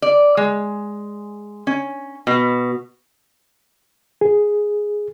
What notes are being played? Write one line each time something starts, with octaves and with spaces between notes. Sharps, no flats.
D5
G#3
C#4
B2
G#4